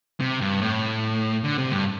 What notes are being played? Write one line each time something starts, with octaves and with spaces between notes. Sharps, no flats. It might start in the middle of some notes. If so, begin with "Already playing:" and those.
C3
G2
A2
D3
C3
G2